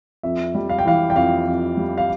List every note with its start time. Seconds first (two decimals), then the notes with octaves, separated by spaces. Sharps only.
0.23 F2 E5
0.55 G3
0.69 F5
0.79 G5
0.85 E3 F5
1.10 G5
1.15 F2 F5
1.46 F2
1.77 G3
1.98 F5